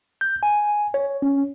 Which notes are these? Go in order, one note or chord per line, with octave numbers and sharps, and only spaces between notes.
G6
G#5
C#5
C#4